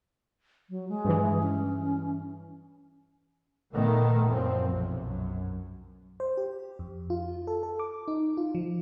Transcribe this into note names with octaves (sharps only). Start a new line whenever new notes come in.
F#3
G#3
G2 E3
C#4
A#2 D#3 A3 B3
F#2 A#2 F3 C4
B1 C3
F#2
C5
G4
F2
F4
A4
A4
D6
D#4
F4
F3